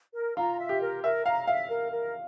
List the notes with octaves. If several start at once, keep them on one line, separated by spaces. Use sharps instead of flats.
A#4
F4 A#5
E5
G4
A#4
A#4 E5
F5 A#5
E5 F5
A#4
A#4